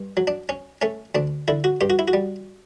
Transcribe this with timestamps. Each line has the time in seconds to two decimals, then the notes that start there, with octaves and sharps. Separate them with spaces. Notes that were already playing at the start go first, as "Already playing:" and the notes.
Already playing: G2
0.17 F#3
0.27 D4
0.49 C#4
0.82 A3 C#4
1.15 D2 D4
1.48 D3 E4
1.64 F#4
1.81 G2 G4
1.90 F#4
1.99 E4
2.08 F#4
2.13 G3